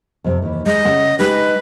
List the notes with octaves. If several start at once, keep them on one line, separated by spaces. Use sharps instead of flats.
F2 C3
D#2 E3
G#3 D#5
C#3 E5 F#5
G#3 D#4 G4 B4